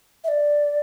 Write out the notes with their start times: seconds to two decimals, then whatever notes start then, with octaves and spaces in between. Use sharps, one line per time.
0.24 E5
0.28 D5